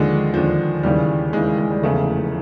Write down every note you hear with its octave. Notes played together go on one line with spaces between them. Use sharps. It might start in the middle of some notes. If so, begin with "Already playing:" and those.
Already playing: D#2 D3 F3 G#3
D#2 D3 F3
D#2 C#3 E3 G3
D#2 C#3 E3 G#3
G#3
G3
F1 E2 C#3 A3